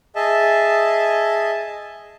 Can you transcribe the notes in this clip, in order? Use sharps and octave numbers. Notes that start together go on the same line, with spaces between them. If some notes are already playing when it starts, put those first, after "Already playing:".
G#4 D#5 E5 A5